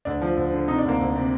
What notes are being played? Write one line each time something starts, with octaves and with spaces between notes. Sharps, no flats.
D2 D4
F3
D2
D3
C3 D#4
D4
D2 A#3
D2
C3